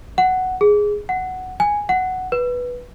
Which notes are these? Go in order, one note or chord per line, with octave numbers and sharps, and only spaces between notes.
F#5
G#4
F#5
G#5
F#5
B4